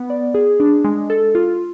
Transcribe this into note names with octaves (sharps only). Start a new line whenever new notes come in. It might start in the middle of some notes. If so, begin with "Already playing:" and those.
Already playing: B3
D5
G#4
D4
G#3
A4
F4